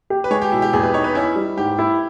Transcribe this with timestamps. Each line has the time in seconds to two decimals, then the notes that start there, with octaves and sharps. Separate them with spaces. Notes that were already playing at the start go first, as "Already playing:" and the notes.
0.10 G4
0.24 B4
0.31 G#3 C#5
0.42 G4
0.52 B2 E4
0.62 G4
0.73 E2 G#4
0.83 B4
0.94 D#4 C#5
1.04 B4
1.15 C#4 E4
1.36 G3
1.57 G#2 G4
1.79 E4